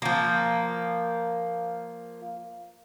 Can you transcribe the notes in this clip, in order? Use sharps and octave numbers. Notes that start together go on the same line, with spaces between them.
F3 A#3